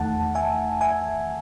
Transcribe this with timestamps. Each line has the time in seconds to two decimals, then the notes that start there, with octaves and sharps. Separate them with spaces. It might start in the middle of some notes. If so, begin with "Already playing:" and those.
Already playing: E2 D#3 A3 F#5 A5
0.35 E5 G#5
0.81 E5 G#5